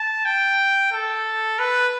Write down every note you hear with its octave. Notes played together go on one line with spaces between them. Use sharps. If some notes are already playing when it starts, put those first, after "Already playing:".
Already playing: A5
G5
A4
B4